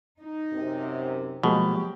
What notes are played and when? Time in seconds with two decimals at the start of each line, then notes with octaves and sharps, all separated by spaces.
0.20 D#4
0.53 F#2 C3
1.43 B2 F3 F#3 G#3 A#3 G4